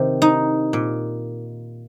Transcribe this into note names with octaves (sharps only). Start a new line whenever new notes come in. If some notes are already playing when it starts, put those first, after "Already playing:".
Already playing: C3 D#3
D#4
A#2